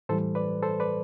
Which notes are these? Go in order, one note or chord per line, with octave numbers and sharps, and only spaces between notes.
A2 E3 G3 A4 C5
B4 D5
A4 C5
B4 D5